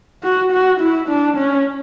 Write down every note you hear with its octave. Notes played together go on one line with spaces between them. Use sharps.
F#4
F#4
E4
D4
C#4